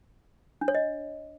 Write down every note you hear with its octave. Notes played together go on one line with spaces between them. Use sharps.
D4
C#5
D#5